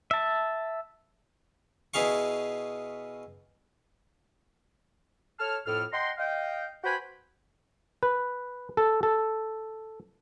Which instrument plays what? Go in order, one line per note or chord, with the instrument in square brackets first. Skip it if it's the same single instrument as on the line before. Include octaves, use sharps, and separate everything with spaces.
[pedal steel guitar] E5 A5
[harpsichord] B2 E4 G#4 F5 C#6
[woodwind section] A4 C#5 A5 F6
F2 A2 A4 F6
D#5 F#5 G5 A#5 C6
D#5 F5 G5
F#4 B4 C5 G5 G#5 B5
[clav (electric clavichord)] B4
A4
A4